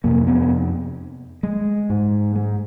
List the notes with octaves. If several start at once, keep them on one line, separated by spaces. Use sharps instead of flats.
F2 C3 A#3
B3
G#3
G#2
G#3